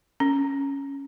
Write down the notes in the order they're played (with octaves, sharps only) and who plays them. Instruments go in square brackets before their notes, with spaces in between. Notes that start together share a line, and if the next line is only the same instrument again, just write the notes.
[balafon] C#4